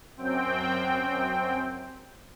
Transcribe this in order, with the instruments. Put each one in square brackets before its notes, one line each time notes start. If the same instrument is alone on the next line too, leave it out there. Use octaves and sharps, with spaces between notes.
[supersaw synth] F#2 C4 G5